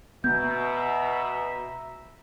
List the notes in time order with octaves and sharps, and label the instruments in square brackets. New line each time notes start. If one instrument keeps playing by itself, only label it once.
[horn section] B2 [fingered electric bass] B3 [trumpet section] E5 A#5 B5 [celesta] G6